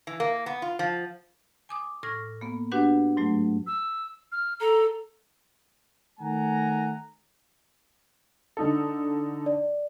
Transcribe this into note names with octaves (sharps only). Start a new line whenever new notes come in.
E3
A#3
B3
F4
F3
G#5 D6 D#6
A2 C#6 F6 G#6 A#6
A#3 B3
D4 F#4 G4 B4 F#5
G#2 F#3 A3
E6
F6
A4 A#5
D#3 A3 F#5 G#5 A#5
D3 D#4 A4
D5